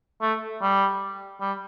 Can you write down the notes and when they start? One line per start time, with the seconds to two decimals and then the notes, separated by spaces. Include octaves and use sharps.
0.22 A3
0.62 G3
1.41 G3